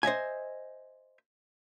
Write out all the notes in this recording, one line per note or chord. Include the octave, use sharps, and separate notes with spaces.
C5 D#5 E5 G#5